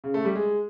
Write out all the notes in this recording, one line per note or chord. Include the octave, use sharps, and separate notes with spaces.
C#3
A3
G3
G#3